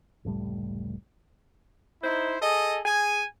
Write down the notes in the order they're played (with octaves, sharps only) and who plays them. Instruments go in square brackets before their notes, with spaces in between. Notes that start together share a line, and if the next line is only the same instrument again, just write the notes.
[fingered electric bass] F1 C#2 A2 G3
[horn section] D#4 E4 C5
G#4 A4 D#5
G#4 G#5